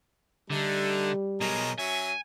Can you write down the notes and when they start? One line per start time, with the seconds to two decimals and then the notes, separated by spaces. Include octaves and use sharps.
0.50 D3 G3 A3 D#4
1.41 B2 F#3 G#4 A#4 D#5
1.79 F#3 C#4 E5 G#5